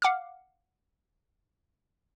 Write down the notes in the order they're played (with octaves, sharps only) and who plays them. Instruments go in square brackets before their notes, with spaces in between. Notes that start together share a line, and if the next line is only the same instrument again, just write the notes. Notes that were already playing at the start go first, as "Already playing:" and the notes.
[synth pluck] F5 F#5 D6 F6